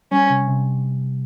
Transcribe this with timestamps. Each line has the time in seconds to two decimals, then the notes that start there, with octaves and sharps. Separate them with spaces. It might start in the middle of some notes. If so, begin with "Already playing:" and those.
0.11 G3 C#4
0.30 C3
0.48 C3